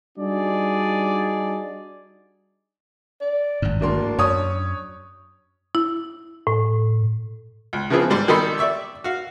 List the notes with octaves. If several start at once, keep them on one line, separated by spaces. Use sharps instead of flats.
G3 D4 D#4 F#4 G#4 D5
D5
G#1 G2
D1 A#3 D4 C6
F#2 C#5 D#6
E4
A2
C#2
C#3 E3 F3 B3 C4 G#4
G#2 G3 C6
D#3 G3 A4 D#5 B5 C6
D5 E5 C#6 E6
F#4 F5